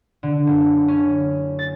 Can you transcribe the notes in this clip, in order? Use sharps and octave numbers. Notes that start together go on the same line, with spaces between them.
D3
F#1
C#4
A6